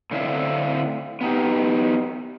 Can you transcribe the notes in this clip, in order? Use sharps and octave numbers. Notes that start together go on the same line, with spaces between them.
A2 D3 C4 E4 E5 F5
B3 D#4 G4